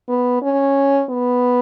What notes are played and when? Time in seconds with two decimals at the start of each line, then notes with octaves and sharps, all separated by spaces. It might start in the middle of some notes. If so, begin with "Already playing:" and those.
0.09 B3
0.43 C#4
1.10 B3